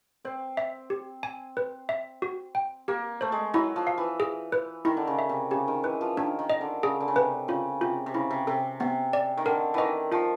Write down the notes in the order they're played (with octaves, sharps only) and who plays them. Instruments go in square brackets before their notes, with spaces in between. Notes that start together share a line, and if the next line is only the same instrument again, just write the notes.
[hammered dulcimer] C4 [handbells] C5
[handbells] E5
G4
G#5
B4
E5
F#4
G5
[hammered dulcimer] A#3 [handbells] G4
[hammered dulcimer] A3 [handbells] C5
[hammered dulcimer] G#3
[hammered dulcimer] F#3 [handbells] E4
[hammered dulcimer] F3
[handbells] F5
[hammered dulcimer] E3
[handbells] G#4
B4
[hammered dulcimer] D#3 [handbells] E4
[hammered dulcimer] D3
C#3
[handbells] E5
[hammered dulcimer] C3
[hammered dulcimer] C#3 [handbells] G4
[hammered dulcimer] D#3
[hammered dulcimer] E3 [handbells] B4
[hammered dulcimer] F3
[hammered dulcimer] D#3 [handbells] D4
[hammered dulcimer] D#3
[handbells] D#5
[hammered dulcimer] D3
[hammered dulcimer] C#3 [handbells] G#4
[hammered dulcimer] D3
C#3
[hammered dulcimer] C3 [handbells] B4
[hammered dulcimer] C#3 [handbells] F4
[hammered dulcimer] C3 [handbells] F4
[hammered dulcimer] C3
[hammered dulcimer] C#3 [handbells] E4
[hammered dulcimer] C3
[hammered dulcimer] C3 [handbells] A4
[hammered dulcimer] C3 [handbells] B3
[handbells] D5
[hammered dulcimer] D#3
[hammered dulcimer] D3 [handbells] A#4
[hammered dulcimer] D#3 E3 [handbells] D#5
[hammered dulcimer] F3 [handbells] F4